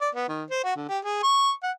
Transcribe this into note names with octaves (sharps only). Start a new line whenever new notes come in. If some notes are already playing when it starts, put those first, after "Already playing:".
D5
B3
D#3
C5
F#4
D3
G4
G#4
C#6
F#5